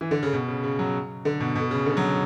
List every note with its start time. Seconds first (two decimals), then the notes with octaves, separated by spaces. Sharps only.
0.01 E3
0.11 D3
0.23 C#3
0.33 B2
0.48 C#3
0.64 C#3
0.79 F#3
1.25 D3
1.40 B2
1.55 B2
1.71 C#3
1.86 D3
1.97 F#3